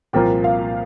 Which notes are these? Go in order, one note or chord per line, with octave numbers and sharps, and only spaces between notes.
C2 A#2 F3 A#3 F4 G5
F5